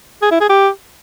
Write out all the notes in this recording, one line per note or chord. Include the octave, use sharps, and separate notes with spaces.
G#4
E4
G#4
G4